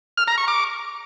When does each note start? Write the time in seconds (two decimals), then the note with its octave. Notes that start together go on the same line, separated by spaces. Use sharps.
0.18 F6
0.28 A#5
0.38 C#6
0.48 D6